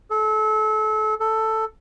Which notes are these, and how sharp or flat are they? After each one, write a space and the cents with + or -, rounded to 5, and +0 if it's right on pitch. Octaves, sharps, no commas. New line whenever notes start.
A4 -30
A4 +5